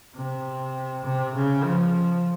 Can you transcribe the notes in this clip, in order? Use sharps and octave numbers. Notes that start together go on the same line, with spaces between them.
C3
C3
C#3
F3